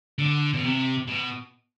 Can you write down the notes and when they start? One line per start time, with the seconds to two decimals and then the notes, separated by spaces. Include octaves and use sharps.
0.18 D3
0.54 B2
0.64 C3
1.08 B2